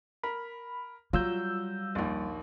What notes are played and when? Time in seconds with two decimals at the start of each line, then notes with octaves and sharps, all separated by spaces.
0.23 A#4 B5
1.13 F#3 G3 F4 E6 G6
1.95 A#1 D#2